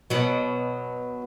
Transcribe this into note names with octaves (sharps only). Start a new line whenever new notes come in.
B2 F#3